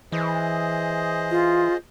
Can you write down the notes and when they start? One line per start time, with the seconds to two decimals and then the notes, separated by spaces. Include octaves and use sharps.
0.12 E3 G#4 C5 D#5
1.31 F4